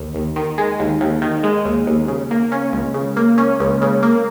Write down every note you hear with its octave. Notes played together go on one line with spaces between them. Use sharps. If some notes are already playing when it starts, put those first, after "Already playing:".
Already playing: D#2
D#2
D#3
G#3
D#2
D#2
D#3
G#3
D#2
D#2
C#3
A#3
C#4
C#2
C#3
A#3
C#4
C#2
C#3
A#3